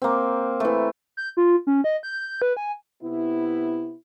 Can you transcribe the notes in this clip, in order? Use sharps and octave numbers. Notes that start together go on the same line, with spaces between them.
A#3 C4
E3 A3
G6
F4
C#4
D#5
G6
B4
G#5
C3 B3 E4